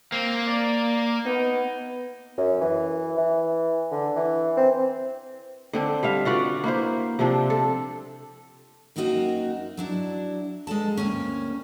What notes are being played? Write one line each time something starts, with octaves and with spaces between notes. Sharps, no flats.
A#3 C4
D5
B3 D#4
F#2
E3
E3
D3
E3
C4
D3 C4 D4
G3 E5 F5
F4 F#4 B4 D5
A#3 E4 C5
C3 F3 C4 D4
A4
F#2 A#3 C4 D#4 F#4 E5
F#3 D4 E4
G#3 B3 A4 A5
D2 A#3 C4 C#4